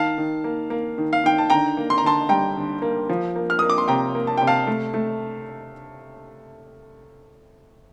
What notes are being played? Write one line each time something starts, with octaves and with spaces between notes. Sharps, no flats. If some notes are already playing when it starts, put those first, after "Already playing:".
Already playing: D#3 F5 A5
D#3
A#3
A#3
D#3
F5
D#3 G5
A5
D3 G5 A#5
A#3
C6
A#5
D3 A5 C6
G3 G5 A#5
D3
A#3
F3
A#3
F6
A#3 D#6
D6
C6
C3 G5 A#5
A#3
A5
C3 G5
F5 A5
A3
A3